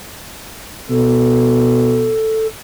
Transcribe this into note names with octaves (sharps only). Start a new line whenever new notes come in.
B2 A4